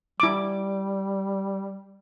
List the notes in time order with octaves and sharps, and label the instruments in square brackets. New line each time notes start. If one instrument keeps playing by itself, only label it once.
[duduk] G3 [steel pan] E4 D6